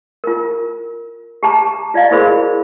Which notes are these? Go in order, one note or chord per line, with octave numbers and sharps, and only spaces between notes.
F4 A#4
G4 A5 A#5 D6
F4 D5 D#5 F5 A#5
E4 F#4 G#4 A#4 C5 B5